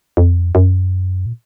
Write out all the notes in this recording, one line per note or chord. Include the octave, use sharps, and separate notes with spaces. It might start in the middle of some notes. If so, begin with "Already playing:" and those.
F2
F#2
A#2